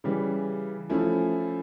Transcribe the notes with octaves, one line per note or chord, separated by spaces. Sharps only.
C#3 E3 G3
F3 A3 C#4 E4